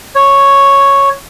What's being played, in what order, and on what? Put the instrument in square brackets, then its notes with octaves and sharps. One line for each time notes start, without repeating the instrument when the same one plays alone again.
[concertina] C#5